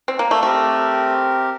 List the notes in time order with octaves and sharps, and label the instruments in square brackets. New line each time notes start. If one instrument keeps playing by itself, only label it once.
[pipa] C4
A#3
A3
[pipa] A3 [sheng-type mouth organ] C4 G4 A#4